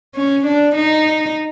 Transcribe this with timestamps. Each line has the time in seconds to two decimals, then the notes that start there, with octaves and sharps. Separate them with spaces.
0.15 C#4
0.45 D4
0.76 D#4